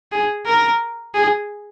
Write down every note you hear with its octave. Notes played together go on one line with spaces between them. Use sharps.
G#4
A#4
G#4